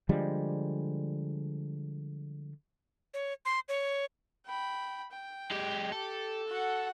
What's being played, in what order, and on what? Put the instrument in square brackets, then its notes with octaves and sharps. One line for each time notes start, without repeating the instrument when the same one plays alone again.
[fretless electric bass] D3 F3 G3 G#3
[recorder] C#5
C6
C#5
[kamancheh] G5 B5
G5
[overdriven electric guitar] G#3 G4
[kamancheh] G4 [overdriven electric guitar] A4
[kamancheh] F#4 F#5